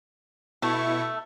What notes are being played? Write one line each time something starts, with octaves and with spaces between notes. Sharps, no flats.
B2 A3 E4 A4 C#6